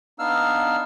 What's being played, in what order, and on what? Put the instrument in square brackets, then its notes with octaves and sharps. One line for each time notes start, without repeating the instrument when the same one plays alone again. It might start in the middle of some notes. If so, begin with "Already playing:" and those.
[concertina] B3 D4 D#4 F5 E6 F6